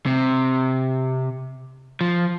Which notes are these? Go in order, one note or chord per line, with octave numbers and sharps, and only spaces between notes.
C3
F3